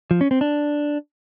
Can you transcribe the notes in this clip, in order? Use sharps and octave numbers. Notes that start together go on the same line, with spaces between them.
F3
C#4
C4
D4